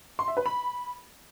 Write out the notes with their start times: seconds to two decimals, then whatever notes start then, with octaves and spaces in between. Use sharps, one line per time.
0.19 C6
0.28 E5
0.37 B4
0.46 B5